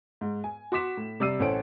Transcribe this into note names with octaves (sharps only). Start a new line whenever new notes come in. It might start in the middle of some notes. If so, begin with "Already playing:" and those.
G#2
G#5
F#4 C6 D6 B6 E7
A2
C3 G3 D5 E6 C7 D#7
A1 C#4 A4 C5 F#5 D7